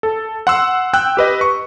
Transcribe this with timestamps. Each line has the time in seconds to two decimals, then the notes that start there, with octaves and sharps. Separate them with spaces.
0.03 A4
0.47 F#5 C6 E6
0.93 G5 E6 F#6
1.17 G4 B4 D#5
1.41 C#6